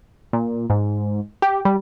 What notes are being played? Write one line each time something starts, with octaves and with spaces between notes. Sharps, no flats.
A#2
G#2
G4
G3